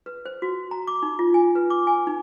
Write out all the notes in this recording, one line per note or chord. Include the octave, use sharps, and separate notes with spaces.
B4
C5
F#4
A#5
D6
D#4
F4
G#5
B4
D6
G#5
D#4